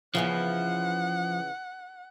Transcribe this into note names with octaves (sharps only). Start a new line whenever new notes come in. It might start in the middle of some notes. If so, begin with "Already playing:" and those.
C#3 E3 F3 B3 F#5